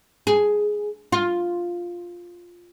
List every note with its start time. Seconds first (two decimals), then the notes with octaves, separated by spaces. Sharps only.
0.27 G#4
1.12 F4